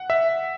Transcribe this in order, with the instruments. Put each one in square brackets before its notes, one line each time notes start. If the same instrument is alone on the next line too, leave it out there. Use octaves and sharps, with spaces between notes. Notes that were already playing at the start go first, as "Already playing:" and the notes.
Already playing: [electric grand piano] F#5
E5